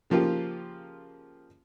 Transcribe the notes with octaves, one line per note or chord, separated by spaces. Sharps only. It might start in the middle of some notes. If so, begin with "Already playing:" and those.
C#3 F3 A#3 F4 G4